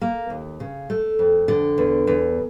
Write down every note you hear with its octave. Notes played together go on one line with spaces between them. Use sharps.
A#3
D#2
C#3
A3
F2
D3
E2
E2